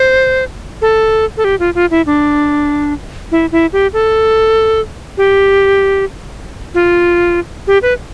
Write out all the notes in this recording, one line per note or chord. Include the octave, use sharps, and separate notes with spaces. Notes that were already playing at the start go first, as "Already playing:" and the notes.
Already playing: C5
A4
A4
G4
F4
F4
E4
D4
E4
E4
G4
A4
G4
F4
G4
B4